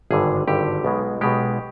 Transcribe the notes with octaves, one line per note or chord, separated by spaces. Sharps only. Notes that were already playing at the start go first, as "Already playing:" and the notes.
G#1 G2 D3 G#4
G#1 G2 D3 G4
B1 B2 G#3
B1 B2 G#3 G4